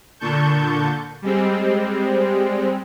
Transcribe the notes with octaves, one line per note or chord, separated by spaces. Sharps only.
A#2 D3 A5 C#6 G6
G3 G#3 C4